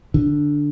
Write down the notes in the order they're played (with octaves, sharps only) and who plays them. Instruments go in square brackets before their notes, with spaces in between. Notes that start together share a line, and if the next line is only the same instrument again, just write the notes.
[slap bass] D3